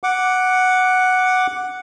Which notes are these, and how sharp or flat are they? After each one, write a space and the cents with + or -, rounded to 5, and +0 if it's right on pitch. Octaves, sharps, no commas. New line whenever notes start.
F#5 +0 D6 +0